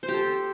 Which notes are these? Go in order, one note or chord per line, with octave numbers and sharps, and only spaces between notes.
C5
G4
A4